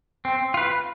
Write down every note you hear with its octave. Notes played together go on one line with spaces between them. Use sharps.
C4
F4 B4